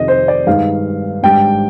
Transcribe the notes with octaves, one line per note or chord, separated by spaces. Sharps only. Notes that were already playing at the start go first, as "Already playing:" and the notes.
Already playing: F2 C3 D#3 D#5
C5
D5
G2 D#3 G#3 D#4 F5
G#1 G#2 G3 D4 G5